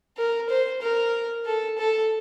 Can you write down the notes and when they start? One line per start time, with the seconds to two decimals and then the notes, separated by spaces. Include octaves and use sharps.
0.17 A#4
0.49 C5
0.82 A#4
1.46 A4
1.78 A4